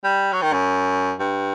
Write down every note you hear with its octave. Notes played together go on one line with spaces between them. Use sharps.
G3
F#3
D#3
F#2
G2